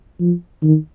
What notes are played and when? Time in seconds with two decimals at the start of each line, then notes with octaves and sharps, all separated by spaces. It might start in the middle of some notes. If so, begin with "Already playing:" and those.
0.20 F3
0.62 D#3